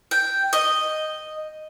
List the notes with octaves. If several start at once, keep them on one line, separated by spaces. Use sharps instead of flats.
G5
D#5